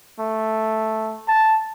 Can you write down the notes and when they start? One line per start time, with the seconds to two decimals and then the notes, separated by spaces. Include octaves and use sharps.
0.19 A3
1.28 A5